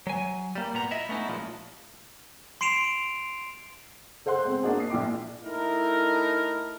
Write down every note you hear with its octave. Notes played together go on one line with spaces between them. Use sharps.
F#3 G#5
G3 A#3
A#2 B3 A#5
E4 D#5 E5
A3 B3 C#4 D#4 E4
A#2 F3 F#3 G#3
C6 C7 D7 E7 F7
A4 C5 F#5 C6 F#6
G#3 C4
A#3 D4 D#4 F#4 G#4
D#6 C7
A#1 A#2 G5 D6
A3 D#4 E4 A#4